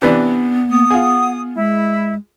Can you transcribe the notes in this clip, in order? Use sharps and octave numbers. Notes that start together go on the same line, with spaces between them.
C3 E3 B3 D4
A#3 D#6
F4 G#4 F#5
G#3 E4